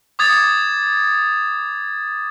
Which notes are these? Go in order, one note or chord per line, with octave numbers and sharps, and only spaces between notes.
D6 D#6 G#6 A6 F7